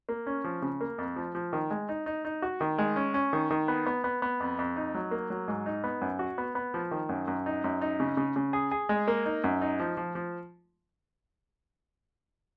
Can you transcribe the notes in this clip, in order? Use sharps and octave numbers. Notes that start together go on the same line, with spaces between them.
A#3
C#4
F3
C#3
A#3
F2
F3
F3
D#3
G#3
D#4
D#4
D#4
F#4
D#3
G#3
C#4
C#4
D#3
D#3
B3
B3
B3
B3
F2
F2
D#4
F#3
A#3
F#3
G#2
D#4
B3
F#2
F#4
B3
B3
F3
D#3
F#2
F#2
D#4
F#2
D#4
C#3
C#3
C#3
G#4
G#4
G#3
A#3
D#4
F#2
D#4
F3
F3
F3